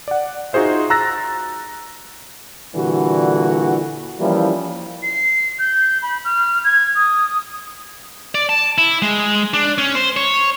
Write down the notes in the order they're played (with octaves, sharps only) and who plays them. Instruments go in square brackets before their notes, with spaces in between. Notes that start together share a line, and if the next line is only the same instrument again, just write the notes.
[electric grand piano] D5 F#5
D#4 F4 F#4 G#4 C5 E5
A#5 E6 F#6 A6 A#6
[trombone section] A#2 D3 E3 G3 F#4
E3 F3 G3 A#3 C#4 E4
[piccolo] C7
G6
B5
F6
G#6
D#6
[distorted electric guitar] D5
A5
E4
G#3
D4
C#4
C5
C#5